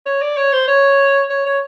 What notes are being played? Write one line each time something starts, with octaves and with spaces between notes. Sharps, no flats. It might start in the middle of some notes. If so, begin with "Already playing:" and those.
C#5
D5
C#5
C5
C#5
C#5
C#5